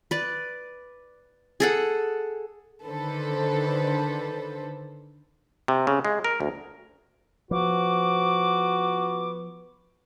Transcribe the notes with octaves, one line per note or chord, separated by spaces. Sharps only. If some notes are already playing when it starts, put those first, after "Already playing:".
B4 D5
G#4 A4 F#5
D3 D#3 A4 B4 C5
C3
C#3
G#3
A#4
D2
F3 B3 F#4 D6